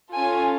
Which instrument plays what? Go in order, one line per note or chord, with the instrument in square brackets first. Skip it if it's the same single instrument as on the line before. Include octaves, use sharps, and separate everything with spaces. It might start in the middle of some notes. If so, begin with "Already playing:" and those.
[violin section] C#4 F4 A4 G#5